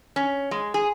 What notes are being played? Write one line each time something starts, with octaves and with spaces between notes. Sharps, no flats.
C#4
G#3
G#4